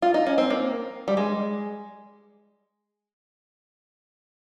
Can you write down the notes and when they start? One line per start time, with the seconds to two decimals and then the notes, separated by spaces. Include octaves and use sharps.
0.02 F4
0.14 D#4
0.27 C#4
0.38 C4
0.50 A#3
1.08 G3
1.17 G#3